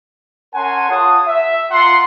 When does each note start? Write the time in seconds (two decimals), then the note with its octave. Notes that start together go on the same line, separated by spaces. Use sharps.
0.54 C#4 A#4 F#5 G#5 A5 C6
0.89 F4 G#4 C#5 F#5 A5 D#6
1.26 E5
1.71 F4 F#5 A#5 C6